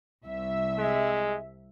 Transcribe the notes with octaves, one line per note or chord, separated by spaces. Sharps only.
C2 E5
G#3